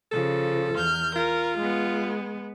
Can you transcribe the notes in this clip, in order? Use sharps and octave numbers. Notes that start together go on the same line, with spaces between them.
C#3 F3 A4
E2 F6 G6
F4 A#4
G#3 B3